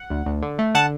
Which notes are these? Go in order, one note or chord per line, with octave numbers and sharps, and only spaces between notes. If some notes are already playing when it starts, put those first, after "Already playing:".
Already playing: F#5
D2
D2
D3
A3
D3 F#5 A5